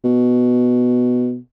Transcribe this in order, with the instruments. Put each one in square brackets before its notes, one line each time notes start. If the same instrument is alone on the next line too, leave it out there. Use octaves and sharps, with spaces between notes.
[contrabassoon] B2